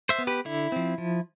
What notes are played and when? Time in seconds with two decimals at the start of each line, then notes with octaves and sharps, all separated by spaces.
0.09 C5 E5
0.18 B3
0.27 G4 B4
0.45 D3 E4
0.72 F3 C4
0.98 F3